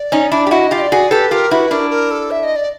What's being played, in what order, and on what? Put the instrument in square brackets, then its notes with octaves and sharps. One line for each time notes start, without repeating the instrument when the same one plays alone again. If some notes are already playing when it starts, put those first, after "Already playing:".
Already playing: [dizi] D5
[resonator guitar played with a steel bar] C#4 D#4
D4 E4
G4
[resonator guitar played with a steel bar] E4 F#4 [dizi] D#5
[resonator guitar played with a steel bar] F4 G4
[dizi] D#5
D5
[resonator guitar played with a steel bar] F#4 G#4
[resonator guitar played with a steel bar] G4 A4 [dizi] B4
[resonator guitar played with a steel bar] F4 G4 [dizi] A#4
[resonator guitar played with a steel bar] E4 F#4 [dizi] B4
[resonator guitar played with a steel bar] D4 E4 [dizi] A#4
[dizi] A#4
A4
E5
D#5
D5